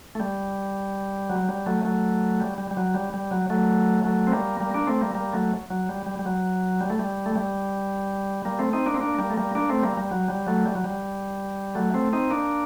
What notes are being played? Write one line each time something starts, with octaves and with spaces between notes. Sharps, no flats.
A3
G3
F#3
G3
F#3 A3
F#3 A3
G3
G3
G3
F#3
G3
G3
F#3
F#3 A3
F#3 A3
C4
G3 A#3
G3 A#3
A#3 D4
A3 C4
G3 A#3
G3 A#3
F#3 A3
F#3
G3
G3
G3
F#3
G3
A3
G3
A3
G3
G3 A#3
A3 C4
C4 D#4
A#3 D4
C4
A#3 D4
G3 A#3
A3
G3 A#3
A#3 D4
A3 C4
G3 A#3
G3
F#3
G3
F#3 A3
G3
F#3
G3
F#3 A3
A3 C4
C4 D#4
A#3 D4